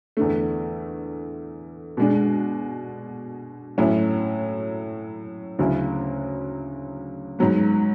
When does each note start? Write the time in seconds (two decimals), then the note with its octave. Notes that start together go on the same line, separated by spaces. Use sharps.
0.17 E2 D3 A3
1.97 B2 G#3 D4
3.78 A2 F#3 C#4 E4
5.59 D2 C#3 F#3 C#4 E4
7.39 G#2 F#3 B3